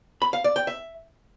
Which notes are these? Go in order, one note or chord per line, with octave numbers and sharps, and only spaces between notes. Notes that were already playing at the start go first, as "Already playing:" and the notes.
B5
F5
D5
G5
E5